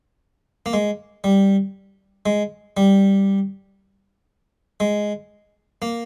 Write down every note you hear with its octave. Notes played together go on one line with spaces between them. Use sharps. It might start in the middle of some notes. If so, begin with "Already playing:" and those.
A#3
G#3
G3
G#3
G3
G#3
A#3